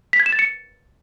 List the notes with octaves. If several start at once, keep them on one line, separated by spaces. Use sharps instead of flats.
B6
G#6
E7
A6
C#7